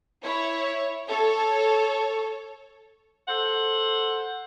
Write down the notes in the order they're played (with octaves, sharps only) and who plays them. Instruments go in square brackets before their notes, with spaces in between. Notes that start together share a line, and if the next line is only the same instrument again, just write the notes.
[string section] E4 C#5
A4 C#5
[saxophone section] A4 C5 F#5